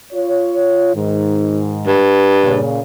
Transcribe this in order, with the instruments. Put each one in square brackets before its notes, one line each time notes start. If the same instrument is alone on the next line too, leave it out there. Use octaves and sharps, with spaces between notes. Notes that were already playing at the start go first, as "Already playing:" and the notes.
[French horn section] F4 C#5
G#2 D#3
[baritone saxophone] G2
[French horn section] A#2 C#3